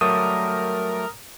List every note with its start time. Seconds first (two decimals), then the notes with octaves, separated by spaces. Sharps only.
0.01 F#3 G3 A3 A#4 D#6